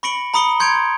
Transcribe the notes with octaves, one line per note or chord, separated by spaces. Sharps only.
B5 C#6 A#6 C#7 D7 F#7
A#5 B5 D#6 C#7 G7
C6 G6 G#6 C#7 D7 F7